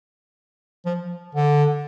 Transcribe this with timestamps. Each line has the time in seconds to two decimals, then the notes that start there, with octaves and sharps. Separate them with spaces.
0.86 F3
1.35 D3